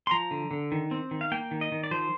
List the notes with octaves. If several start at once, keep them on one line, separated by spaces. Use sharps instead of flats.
C6
F3 A#5
D3
D3
D#3
C4
D#3
F5
A#3 G5
D#3
D#5
D#3
D5
F3 C5